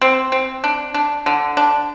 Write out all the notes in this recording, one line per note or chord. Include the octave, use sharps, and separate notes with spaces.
C4
C4
D4
D4
D3
D4